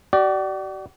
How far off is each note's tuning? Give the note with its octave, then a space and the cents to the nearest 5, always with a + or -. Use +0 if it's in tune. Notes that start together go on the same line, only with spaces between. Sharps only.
F#4 +45 D5 +10